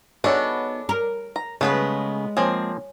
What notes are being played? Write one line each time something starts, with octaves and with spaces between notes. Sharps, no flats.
B3 D4 D#4 F#4 G#4 A4 C#5 G#5
A#4
A#5
C#3 G#3 A3 B3 B4 C#5
F3 A#3 C4 G#4 C#5 G#5 A5